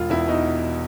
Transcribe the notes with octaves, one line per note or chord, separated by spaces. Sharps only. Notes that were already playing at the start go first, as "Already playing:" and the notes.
Already playing: E1 F4
E2 E4
B2 D#4